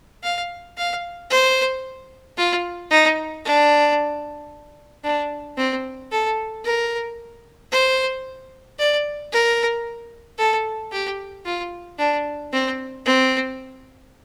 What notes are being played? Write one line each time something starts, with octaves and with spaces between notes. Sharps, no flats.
F5
F5
C5
F4
D#4
D4
D4
C4
A4
A#4
C5
D5
A#4
A4
G4
F4
D4
C4
C4